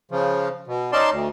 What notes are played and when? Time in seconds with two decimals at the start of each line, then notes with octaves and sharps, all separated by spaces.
0.11 C#3 F3
0.67 B2
0.92 C#4 D#4 D5 A5 C6
1.10 D2